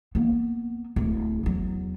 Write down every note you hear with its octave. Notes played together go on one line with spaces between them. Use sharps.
A#3 B3
D1
E2 F#3